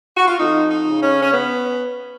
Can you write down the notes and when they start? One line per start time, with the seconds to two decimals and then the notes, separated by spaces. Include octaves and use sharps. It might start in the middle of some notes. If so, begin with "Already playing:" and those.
0.17 F#4
0.28 F4
0.38 F2 D#4
0.71 D#4
0.86 C#3
1.02 C#4
1.22 C#4
1.33 B3